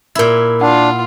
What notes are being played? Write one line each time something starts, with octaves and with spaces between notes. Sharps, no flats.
A#2 E4 A#4 G#6
D4 F4 F#5